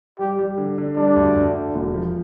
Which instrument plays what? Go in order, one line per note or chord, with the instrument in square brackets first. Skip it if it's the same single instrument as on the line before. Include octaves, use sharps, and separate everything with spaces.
[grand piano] G3 [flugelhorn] G4
[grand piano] G3
D3
D3
[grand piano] G3 [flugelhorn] D4
[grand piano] D2
D2
D3
E1
F3